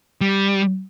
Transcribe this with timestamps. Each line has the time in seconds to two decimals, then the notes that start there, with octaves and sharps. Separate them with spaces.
0.21 G3